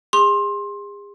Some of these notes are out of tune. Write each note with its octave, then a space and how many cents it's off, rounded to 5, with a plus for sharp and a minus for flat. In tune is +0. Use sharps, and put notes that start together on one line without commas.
G#4 -40 C6 +20